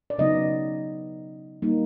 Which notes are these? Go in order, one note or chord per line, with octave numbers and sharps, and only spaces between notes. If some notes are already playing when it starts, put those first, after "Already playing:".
D5
C#3 F#3 B3 D#4 D#5
G3 A#3 D#4